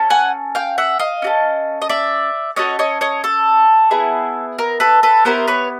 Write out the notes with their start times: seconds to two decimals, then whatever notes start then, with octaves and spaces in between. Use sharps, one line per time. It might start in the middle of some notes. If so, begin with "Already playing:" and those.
Already playing: C#4 A4
0.10 F#5 G#5
0.55 F5 G5
0.78 E5 F#5
0.99 D#5 F5
1.22 C#4 F#4 A4
1.82 D#5
1.89 D5 E5
2.56 C#4 F#4 A4 C#5 D#5
2.79 C#5 D#5
3.01 C#5 D#5
3.24 A4
3.91 B3 E4 G#4
4.58 A#4
4.80 A4 B4
5.03 A4 B4
5.25 B3 E4 G4 A#4 C5
5.48 B4 C#5